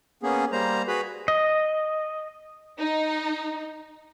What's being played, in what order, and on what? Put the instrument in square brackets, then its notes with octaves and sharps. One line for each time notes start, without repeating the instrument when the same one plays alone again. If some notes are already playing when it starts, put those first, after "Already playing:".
[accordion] A#3 B3 C#4 G#4
G3 A#3 C5 A#5
F#4 G#4 B4 B5
[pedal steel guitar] D#5
[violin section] D#4